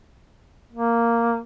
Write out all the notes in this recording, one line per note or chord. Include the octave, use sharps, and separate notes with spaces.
A#3